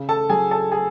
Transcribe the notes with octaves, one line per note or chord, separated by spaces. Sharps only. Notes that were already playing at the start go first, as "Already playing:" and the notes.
Already playing: C#3
A4 A5
F#3 G#4 G#5
A4 A5
G#4 G#5